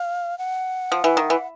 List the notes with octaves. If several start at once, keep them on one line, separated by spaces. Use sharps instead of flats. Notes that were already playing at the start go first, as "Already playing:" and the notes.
Already playing: F5
F#5
F3
E3
D#3
E3